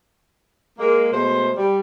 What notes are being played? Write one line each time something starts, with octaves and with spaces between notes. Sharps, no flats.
G#3 A#3
B2 G#3 A3 C5
G3